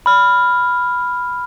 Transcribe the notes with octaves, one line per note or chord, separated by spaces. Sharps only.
B5 F6